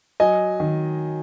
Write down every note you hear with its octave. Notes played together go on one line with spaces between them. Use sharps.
F#3 D#5 G#5
D#3